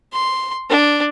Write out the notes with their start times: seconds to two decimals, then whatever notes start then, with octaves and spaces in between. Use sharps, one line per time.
0.13 C6
0.70 D4